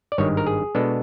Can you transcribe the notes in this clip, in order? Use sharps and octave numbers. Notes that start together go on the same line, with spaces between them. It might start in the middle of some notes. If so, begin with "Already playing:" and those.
D5
G#1 G2 D#3 G#3 C#5
A#4
G#4
B2 G#3 B3 D4 A4